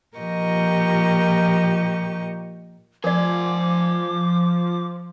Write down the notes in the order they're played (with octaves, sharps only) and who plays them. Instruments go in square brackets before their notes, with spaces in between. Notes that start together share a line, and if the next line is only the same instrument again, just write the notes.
[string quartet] A#2 F3 G4 A#4 D#5 C#6
[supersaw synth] F3 [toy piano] A#4 D5 [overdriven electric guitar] C5 G#5 [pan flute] D6